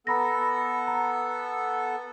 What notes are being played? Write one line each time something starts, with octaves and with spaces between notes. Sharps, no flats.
B3 A4 A#5 B5 A#6
A#5